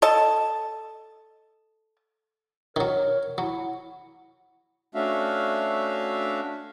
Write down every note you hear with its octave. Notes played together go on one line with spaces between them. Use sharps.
A4 D#5 A5
D#3 F#3 A#4 C#5
F#3 E4 F#5
A3 C#4 D4 F#4 E5 F5